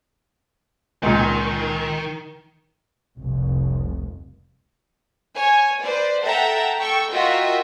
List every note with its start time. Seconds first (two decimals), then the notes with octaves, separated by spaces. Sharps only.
1.03 C#2 A#2 D#3
3.19 F1 C2 F2
5.35 C#5 G#5
5.83 B4 C5 D5
6.24 A4 E5 F#5 G5 A5 A#5
6.79 A4 G5 C#6 E6
7.11 F4 F#4 A#4 D#5 E5 G5